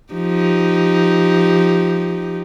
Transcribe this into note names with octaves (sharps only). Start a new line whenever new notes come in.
F3 D#4 G4